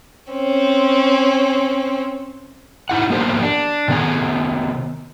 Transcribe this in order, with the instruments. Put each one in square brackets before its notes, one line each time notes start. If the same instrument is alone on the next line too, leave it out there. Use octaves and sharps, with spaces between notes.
[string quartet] C4 C#4
[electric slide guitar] D#4 E4 F#5
A#3 B3 D4 G4 A#4 C5
D4
C3 D#3 B3 D5 G#5